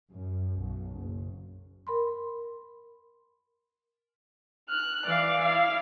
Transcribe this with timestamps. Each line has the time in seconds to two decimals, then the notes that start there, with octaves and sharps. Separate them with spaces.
0.11 F#2
0.60 B1
0.94 F#1
1.87 A#4 B5 C6
4.68 F6 F#6
5.06 E3 D5 F5
5.41 E4 F5